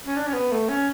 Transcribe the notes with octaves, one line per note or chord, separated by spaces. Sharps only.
C#4
D4
C#4
B3
A3
C#4